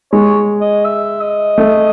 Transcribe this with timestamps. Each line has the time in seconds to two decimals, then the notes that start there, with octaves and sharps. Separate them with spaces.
0.12 G#3 C#5
0.61 D#5
0.85 E5
1.21 D#5
1.58 A3